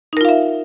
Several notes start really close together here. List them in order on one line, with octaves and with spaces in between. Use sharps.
D#4 A#4 F4 F5 E5